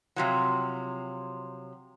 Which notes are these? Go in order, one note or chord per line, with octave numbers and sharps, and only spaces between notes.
C3 F3 F#3